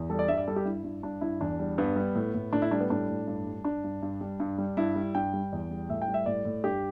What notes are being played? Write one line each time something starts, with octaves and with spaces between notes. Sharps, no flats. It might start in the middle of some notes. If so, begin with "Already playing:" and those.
Already playing: E2
G3 A4
D5
G2 E5
D5
G3 A4
G4
G2 E4
G2
G2 D4
G2 E4
E2 D4
G3
G2 B3
G3
A2
A2
A2 D4
E4
G3 D4
B3
A2 D4
A2
G2
G3
G2 D4
G2
G2
G3
G2
G3
G2 E4
G3
G2 G5
G3
E2
G3
A2 E5
G5
G3
E5
A2 D5
A2
G2 G4